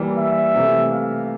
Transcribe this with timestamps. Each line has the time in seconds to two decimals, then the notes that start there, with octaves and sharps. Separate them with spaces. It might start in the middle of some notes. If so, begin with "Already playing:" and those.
Already playing: E3 G3 A#3
0.17 E5
0.55 C3 E3 A3
0.92 F5